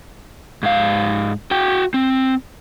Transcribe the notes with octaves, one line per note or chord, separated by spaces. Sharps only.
G#2 F5
F#4 G5
C4